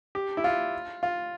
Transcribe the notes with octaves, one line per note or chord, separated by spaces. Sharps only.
G4
E4
F4
F4